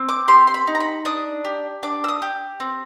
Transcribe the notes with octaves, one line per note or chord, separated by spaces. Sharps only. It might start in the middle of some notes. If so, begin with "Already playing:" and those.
Already playing: C4
D6
G4 C6
C6
B5
D#4
A#5
B5
D4 D#6
G4
D4 D6
E6
D#6
G4
C4